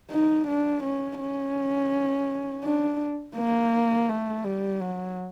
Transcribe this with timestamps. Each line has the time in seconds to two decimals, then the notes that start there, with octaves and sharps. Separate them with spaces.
0.11 D#4
0.48 D4
0.83 C#4
1.20 C#4
2.64 D4
3.37 A#3
4.09 A3
4.45 G3
4.81 F#3